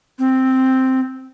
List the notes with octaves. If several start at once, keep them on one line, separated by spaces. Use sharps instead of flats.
C4